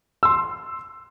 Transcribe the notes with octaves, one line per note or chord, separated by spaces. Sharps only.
C6 E6